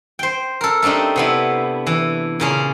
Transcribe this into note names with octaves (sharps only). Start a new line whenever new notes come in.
C5 G5
A4 A#4
A3 C4 D4 D#4 G4
C3 B3 E4
E3
A#2 C#3 C#4